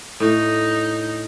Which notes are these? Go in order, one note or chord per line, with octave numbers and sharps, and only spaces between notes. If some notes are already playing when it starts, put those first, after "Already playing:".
A2 D#4